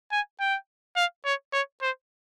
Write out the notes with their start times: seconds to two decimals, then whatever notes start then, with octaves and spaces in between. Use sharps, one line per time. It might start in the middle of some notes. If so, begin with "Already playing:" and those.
0.12 G#5
0.40 G5
0.96 F5
1.25 C#5
1.53 C#5
1.82 C5